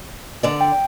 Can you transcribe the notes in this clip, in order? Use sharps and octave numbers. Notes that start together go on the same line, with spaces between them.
D3 D5
G5